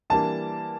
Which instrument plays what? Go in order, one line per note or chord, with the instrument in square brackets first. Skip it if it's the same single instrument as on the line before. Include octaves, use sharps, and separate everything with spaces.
[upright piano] E3 G3 A#3 D4 [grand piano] A5